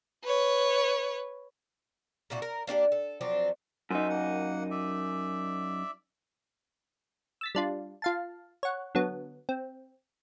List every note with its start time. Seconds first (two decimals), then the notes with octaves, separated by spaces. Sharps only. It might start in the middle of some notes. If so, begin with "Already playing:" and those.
0.24 B4 C#5
2.30 A#2 D4 E4 F#4
2.42 A#4
2.67 A#3 D4 F#4 G4
2.92 A4
3.21 F3 F#3 C4 D4
3.90 F#2 D#4 C5 E5
4.10 A#3 F#5
4.71 D5 E5
7.41 E6 A6 B6
7.55 G3 D4 F4
8.02 F4 F5 A5
8.63 C#5 F#5
8.95 D3 F#3 B3
9.49 C4